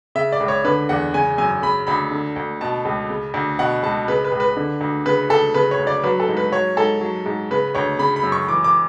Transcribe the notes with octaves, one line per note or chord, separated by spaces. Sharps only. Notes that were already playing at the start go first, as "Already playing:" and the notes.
C#3 E5
D5
C#2
C#5
D3 B4
E2 F#5
C#3 G#5
F#2 G#5
C#3 B5
D2 B5
D3
D2
B2 A5
C#2
C#3
D2
B2 F#5
C#2 A5
C#3 B4
B4
C#2
B4
D3
D2
C#3 B4
D2 A4
C#3 B4
C#5
D2
D5
F#3 B4
A4
G#2
B4
F#3 C#5
G#2 A4
F#3
G#2
C#3 B4
D2 C#5
C#3 B5
B5
F#2
C#6
E3 D6
D6